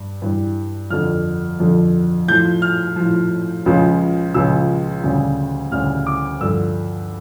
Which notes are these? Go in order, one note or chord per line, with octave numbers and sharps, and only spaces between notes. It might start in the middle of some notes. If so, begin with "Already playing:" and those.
Already playing: G2 G3
G2 E3 G3
F2 D3 F3 F6
F2 D3 F3
A2 F3 G6
F6
A2 F3
C#2 C#3 F3
C#2 C#3 F3 E6
D2 C#3 G3
D2 C#3 G3 F6
D6
G2 D3 F3 E6